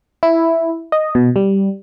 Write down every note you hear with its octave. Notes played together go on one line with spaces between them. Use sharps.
E4
D#5
B2
G3